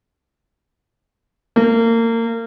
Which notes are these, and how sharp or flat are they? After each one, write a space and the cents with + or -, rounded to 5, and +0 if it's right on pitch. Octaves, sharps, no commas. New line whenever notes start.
A#3 -30